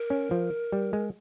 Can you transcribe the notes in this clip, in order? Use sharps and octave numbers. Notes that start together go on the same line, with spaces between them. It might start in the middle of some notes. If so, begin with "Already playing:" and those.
Already playing: A#4
C#4
F3
G3
G#3